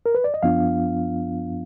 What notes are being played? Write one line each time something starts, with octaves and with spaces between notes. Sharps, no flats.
A#4
B4
D5
D#5
F#2 F3 B3 D4 F4 F5